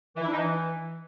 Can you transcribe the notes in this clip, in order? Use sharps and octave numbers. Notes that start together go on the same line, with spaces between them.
E3
E4
D4
D#4
E3